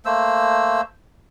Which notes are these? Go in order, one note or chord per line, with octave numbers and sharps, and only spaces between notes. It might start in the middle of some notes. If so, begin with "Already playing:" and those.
A3 A#3 C5 E6